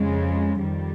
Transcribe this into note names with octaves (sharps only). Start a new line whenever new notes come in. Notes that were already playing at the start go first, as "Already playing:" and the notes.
Already playing: F2 C#3 G#3
F2 D#3 G3